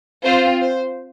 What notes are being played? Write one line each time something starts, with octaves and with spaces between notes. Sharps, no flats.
C4 F4 C5
C5